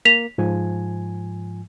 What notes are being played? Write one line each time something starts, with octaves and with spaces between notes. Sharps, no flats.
A#3 B6 F7
G#2 F3 G#5